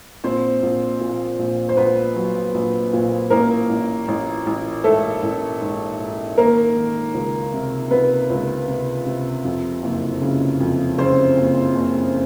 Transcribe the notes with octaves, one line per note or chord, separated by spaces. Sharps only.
A#1 C4 C5
A#1
A#2
A#1
C5
A#1 B3 B4
F#3
A#1
A#2
A1 A#3 A#4
A1
A1
A1
G#2 A3 A4
A1
G#2
G#2
D#3 A#3 A#4
D#3
C#2
C3
C3 B3 B4
C#2
C3
C3
F2
F#1
C#3
F2
C#3 C4 C5
F#1
F#1